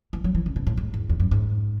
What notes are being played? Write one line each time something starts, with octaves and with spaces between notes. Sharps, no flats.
E3
F#3
E3
C#3
B2
A2
G#2
E2
E2
F#2
G#2